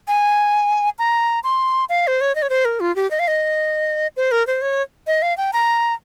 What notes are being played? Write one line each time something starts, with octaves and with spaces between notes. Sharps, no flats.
G#5
A#5
C6
F5
C5
C#5
D#5
C#5
C5
A#4
F4
G4
D#5
F5
D#5
C5
A#4
C5
C#5
D#5
F5
G5
A#5